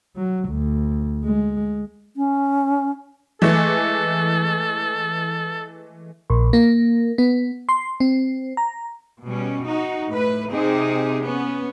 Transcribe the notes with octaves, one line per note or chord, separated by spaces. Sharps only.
F#3
D2
G#3
C#4
E3 G#3 A3 A4
A#1
A#3
B3
C6
C4
A#5
B2 G3 C#4
D#4 F#4
A2 B4
C3 C4 D#4 G4 G#4
B3 C#4